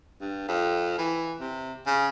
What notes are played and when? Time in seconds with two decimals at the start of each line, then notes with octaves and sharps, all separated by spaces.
0.21 G2
0.48 F2
0.98 E3
1.40 C3
1.87 C#3